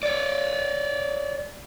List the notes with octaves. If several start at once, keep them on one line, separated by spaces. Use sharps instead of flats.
C#5 D5